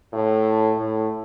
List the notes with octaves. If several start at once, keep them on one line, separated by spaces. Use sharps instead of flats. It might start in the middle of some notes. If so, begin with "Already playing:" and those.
A2
A2